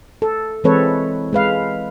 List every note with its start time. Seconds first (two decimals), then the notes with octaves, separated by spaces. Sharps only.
0.22 A4
0.64 E3 G#3 C4 A4 B4 C#5
1.33 G#3 B4 F5